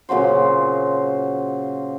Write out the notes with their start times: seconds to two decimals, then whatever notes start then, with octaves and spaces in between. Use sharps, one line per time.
0.09 A#2 C#3 F#3 C5